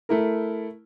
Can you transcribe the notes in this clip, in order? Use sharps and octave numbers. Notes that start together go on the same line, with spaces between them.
A3 E4 A#4